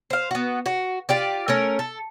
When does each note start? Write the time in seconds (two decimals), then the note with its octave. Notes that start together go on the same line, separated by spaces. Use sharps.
0.10 C5 F5
0.31 B3 F#4
0.66 F#4
1.09 F4 G4 D5
1.48 A3 C#4 A#4
1.79 A4